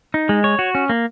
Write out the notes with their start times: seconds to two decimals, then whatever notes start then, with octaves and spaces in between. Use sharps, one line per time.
0.14 D#4
0.29 G#3
0.44 C#5
0.59 F#4
0.75 C#4
0.89 A#3